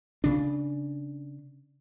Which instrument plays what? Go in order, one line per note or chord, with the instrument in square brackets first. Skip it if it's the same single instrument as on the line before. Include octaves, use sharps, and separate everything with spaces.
[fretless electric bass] C#3 D4